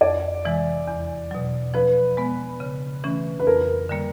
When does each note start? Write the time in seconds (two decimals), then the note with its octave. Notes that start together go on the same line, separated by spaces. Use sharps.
0.01 F2 D5
0.45 C3 E3 G#3
0.87 E2
1.31 B2 F#3
1.74 F3 B4
2.17 G#3 B3
2.60 C#3
3.04 E3 A3 C#4
3.40 B4
3.47 F2 A#4
3.89 D3 G3 A#3